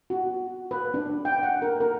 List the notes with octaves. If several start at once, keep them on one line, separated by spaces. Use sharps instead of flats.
F#4
B4
D4
G5
F#5
A#4
A#4